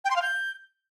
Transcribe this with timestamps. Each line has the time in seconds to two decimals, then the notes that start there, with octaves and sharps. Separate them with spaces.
0.05 G5
0.10 C6
0.16 F5
0.22 G6